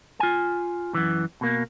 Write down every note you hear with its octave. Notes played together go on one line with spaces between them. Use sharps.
F4 G#5
F#2 E3
B2 A#3